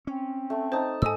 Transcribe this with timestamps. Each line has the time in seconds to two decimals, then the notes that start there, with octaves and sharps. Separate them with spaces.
0.07 C4 C#4
0.50 A3
0.72 D#4 C5 A5
1.02 G#2 A4 D#5 G#5 D#6 E6